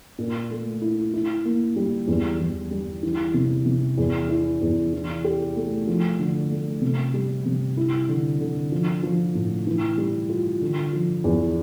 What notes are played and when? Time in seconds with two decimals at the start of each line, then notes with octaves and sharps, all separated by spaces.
0.18 A#2
0.50 A3
0.82 E4
1.14 E4
1.45 A#3
1.76 G3
2.08 E2
2.40 E2
2.71 G3
3.03 E3
3.34 C3
3.66 C3
3.97 E2
4.29 E4
4.61 E2
4.93 E3
5.24 G4
5.56 A3
5.87 F3
6.19 D3
6.51 A3
6.82 C3
7.14 G3
7.45 C3
7.77 E4
8.09 D3
8.40 D3
8.72 F3
9.03 F3
9.35 A2
9.67 E3
9.98 G3
10.29 F4
10.61 D3
10.93 F3
11.24 E2